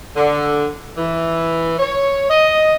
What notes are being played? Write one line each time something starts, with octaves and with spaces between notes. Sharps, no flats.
D3
E3
C#5
D#5